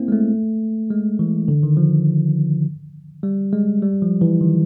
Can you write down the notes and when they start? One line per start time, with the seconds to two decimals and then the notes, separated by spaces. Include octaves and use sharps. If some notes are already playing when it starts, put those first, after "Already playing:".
Already playing: A#3 C4 E4
0.08 G#3
0.12 A3
0.90 G#3
1.19 E3
1.48 D3
1.63 D#3
1.77 F3
3.23 G3
3.53 G#3
3.82 G3
4.02 F3
4.21 E3
4.41 D#3